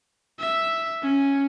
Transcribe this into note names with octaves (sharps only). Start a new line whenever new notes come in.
E5
C#4